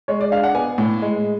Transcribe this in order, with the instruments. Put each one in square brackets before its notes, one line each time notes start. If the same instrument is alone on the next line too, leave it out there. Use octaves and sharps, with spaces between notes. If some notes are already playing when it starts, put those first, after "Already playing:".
[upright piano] G#3 C#5
D5
D4 F5
F#5
B3 G#5
A2
G#3